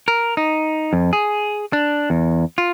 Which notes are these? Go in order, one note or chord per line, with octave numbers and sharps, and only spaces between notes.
A#4
D#4
F2
G#4
D4
E2
F4